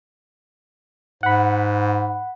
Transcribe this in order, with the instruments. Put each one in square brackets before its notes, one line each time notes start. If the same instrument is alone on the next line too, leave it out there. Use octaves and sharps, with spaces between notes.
[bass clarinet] G#2 [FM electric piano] F#5 B5